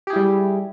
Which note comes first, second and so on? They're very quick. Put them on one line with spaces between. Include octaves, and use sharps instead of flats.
G4 G#4 E4 G3